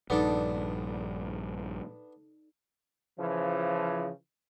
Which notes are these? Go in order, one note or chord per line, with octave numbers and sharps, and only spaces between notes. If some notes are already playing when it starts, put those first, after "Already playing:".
A#1 G2 B3 D4 D#4 A4 D5
C#3 E3 F3